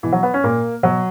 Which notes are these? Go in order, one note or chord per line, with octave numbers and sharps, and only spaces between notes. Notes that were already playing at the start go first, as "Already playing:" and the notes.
B2 E3
F#3
B3
C#4
A#2 A#3
B2 F#3